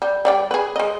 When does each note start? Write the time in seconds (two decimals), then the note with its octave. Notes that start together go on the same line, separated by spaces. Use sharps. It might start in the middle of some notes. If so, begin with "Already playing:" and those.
0.02 G3
0.25 G3 D5 G5
0.51 G#4 B4
0.76 G#3 D#5